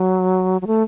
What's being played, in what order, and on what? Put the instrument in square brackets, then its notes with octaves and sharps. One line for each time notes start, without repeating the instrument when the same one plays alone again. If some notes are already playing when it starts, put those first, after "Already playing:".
Already playing: [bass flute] F#3
F#3
A3